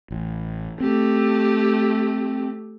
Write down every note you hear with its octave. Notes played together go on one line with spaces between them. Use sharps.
A1
A3 C4 G4